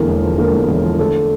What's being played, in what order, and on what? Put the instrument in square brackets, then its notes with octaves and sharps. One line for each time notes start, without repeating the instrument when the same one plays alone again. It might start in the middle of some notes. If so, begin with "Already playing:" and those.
Already playing: [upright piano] E2 D3 A#3 A#4
E1
F3
D3 A#3 A#4
E2
E1
F3
D3 A3 A4